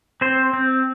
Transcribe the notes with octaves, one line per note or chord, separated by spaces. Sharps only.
C4 C5
C4